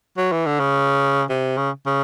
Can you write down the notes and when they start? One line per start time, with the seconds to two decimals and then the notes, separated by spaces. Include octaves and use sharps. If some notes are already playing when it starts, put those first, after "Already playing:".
0.17 F#3
0.32 E3
0.46 D3
0.60 C#3
1.29 C3
1.57 C#3
1.86 C#3